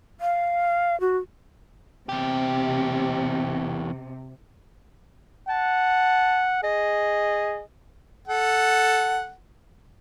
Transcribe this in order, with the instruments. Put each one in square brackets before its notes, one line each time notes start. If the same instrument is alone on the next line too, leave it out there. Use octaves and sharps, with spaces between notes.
[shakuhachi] F5
F#4
[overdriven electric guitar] E2 G4 [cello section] C3
[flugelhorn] F#5 [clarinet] A5
[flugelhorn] G#4 [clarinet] D#5
[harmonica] A4 F#5